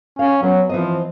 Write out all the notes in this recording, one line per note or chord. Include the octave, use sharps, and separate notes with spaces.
C#4 F5
F#3 B3
E3 F3 C4 D#5